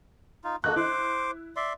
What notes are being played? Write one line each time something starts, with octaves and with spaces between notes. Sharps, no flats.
D#4 F4
A#3 F#4 A4 D#5 F#6
E4 C5 D6
D5 E5 C6